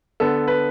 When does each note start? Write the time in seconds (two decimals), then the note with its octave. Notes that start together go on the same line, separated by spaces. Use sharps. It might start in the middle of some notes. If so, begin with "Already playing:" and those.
0.20 D3 B3 A4
0.48 B4